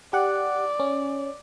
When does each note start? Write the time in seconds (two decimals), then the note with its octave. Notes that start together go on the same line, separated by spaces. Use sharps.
0.13 G4 D5 F#5
0.80 C#4